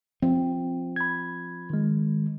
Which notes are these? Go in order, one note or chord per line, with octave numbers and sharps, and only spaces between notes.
F3 C4
B5 G#6
D#3 G#3